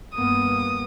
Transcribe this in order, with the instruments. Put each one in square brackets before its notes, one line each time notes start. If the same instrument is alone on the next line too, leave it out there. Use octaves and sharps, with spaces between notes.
[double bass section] G2 A#3 B3 [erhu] D#6